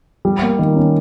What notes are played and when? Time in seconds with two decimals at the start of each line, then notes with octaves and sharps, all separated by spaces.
0.25 G3
0.42 A#3
0.59 D#3
0.76 C#4